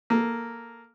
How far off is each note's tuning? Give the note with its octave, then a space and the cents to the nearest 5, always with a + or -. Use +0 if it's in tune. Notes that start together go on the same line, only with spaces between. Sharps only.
A#3 +0 A4 +0